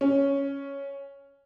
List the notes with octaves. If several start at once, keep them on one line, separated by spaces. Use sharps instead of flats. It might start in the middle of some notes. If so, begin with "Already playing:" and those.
C#4